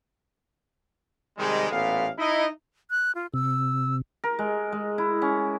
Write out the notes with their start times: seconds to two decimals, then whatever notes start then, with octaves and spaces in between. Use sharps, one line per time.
1.38 C3 D#3 G3 G#3
1.70 A1 A#2 B3 A4 F5
2.17 D#4 E4 D#5
2.90 F#6
3.15 F4
3.34 C3 E6
4.24 A#4
4.39 G#3
4.72 G#3
4.98 E4
5.22 C#4